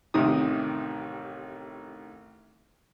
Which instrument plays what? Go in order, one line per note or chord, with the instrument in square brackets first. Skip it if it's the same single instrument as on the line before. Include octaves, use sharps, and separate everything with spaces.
[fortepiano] A1 C3 D#3 D#6